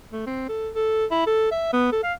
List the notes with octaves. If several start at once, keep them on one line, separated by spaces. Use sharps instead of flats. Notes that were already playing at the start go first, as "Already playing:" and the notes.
A3
C4
A4
A4
E4
A4
E5
B3
A4
F5